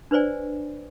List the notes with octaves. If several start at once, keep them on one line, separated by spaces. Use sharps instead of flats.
D4 B4 C5 D5 G#5